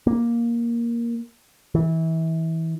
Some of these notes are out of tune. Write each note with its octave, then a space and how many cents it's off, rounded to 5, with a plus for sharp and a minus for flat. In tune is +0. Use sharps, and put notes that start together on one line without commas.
A#3 +10
E3 -25